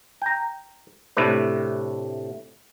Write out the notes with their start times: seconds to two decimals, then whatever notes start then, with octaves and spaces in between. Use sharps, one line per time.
0.22 G5 A#5
1.17 A2 C3 A3 D4 B4